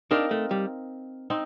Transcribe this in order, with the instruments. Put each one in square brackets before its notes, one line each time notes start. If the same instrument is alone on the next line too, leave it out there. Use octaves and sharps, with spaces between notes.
[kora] C4 D#4 A#4 F5 [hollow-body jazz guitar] D4
[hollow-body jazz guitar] A3
G3
[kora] C4 D#4